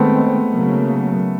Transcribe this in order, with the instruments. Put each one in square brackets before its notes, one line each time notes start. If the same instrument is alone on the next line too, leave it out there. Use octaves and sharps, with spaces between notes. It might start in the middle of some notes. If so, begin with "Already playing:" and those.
Already playing: [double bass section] D#3 G#3 C4 [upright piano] A3 B3
[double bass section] C#3 F#3 A#3